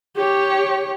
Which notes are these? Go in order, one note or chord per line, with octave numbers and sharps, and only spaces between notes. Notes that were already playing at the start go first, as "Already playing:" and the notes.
G4 C#5